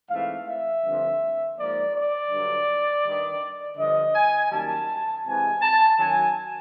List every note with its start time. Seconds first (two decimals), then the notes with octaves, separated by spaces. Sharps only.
0.09 G#2 E3 A3 C4 F5
0.47 E5
0.83 G2 D3 F3 A3 C4
1.57 G#2 F3 A#3 D5
1.94 D5
2.31 G2 D3 F#3
3.04 G2 D#3 G3
3.78 G2 D3 F3 D#5
4.15 G#5
4.51 F#2 D#3 G3 A#3 A5
5.25 C3 E3 G#3 C4 G#5
5.62 A5
5.99 F#2 D#3 F#3 G#5